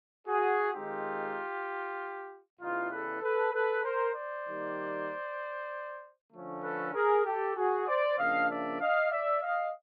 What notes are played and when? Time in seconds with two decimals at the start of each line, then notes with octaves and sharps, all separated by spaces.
0.27 F#4 G#4
0.73 D#3 G#3 C4 D#4 F4 G4
2.59 E2 C#3 E3 G3 D#4 F4
2.91 A4 B4
3.21 A4 B4
3.52 A4 B4
3.83 A#4 C5
4.14 C5 D5
4.46 D#3 G3 A#3
6.32 D3 F3 A3 C#4
6.63 A4 B4
6.94 G#4 A#4
7.25 G4 A4
7.56 F#4 G#4
7.87 C5 D5
8.18 C#3 F3 A#3 D4 D#5 F5
8.49 D5 E5
8.80 D#5 F5
9.11 D5 E5
9.42 D#5 F5